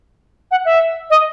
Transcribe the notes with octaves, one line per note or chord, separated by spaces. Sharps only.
F#5
E5
D#5